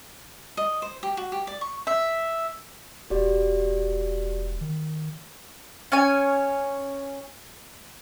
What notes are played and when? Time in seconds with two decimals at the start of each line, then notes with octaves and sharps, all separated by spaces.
0.57 D#5
0.82 C5
1.03 G4
1.17 F#4
1.32 G4
1.47 D5
1.61 C#6
1.87 E5
3.10 E1 F#4 G4 D5
4.61 D#3
5.92 C#4 C#5 G#5